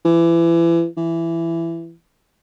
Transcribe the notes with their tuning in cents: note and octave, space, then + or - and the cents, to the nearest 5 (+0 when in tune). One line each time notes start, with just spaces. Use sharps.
E3 +30
E3 +15